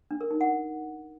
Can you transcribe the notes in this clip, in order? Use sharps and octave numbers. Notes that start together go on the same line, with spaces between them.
D4
A#4
D#4
F#5